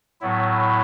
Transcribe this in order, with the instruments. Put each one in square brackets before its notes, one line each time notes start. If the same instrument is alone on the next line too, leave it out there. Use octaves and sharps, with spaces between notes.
[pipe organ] A2 F#3 B3 E4